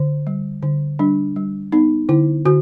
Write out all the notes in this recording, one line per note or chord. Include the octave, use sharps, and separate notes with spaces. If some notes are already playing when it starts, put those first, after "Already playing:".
Already playing: D3
G3
D3
G3 D4
G3
B3 D#4
D3 E4
D3 F#4